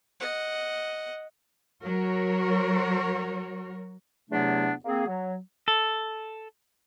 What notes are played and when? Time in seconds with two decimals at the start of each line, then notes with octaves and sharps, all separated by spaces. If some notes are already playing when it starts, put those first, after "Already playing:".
0.20 D#5 F#5
1.83 F#3 F#4 A#4 C#5
4.30 E2 C3 F#3 A3 B3 D4
4.85 A#3 C4 G#4
5.07 F#3
5.68 A4